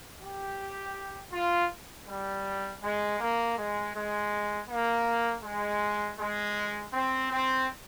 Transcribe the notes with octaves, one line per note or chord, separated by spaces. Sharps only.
G4
F4
G3
G#3
A#3
G#3
G#3
A#3
G#3
G#3
C4
C4